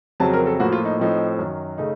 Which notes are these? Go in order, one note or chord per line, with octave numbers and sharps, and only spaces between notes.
F2 C#3 F#3 C4 A5
A#4
A4
A2 F3 A#3 F#4
F4
D#4
A2 F3 C4 D#4
F#2 D#3 F#3
C#3 A3 D#4